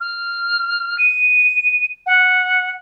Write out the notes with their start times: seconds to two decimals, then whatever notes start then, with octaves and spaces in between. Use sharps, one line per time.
0.01 F6
0.98 D#7
2.06 F#5